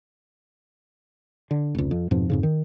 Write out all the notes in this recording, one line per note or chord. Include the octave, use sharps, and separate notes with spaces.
D3
F1 C#2
F2
F2 G#2 B2 F3
F2 G#2 C#3
D#3